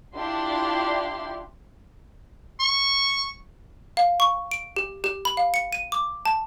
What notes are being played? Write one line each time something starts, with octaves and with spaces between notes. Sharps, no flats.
D4 E4 F4 G4 C6
C#6
F5
C#6
D7
G4
G4
B5
F5
C#7
D#7
D6
A5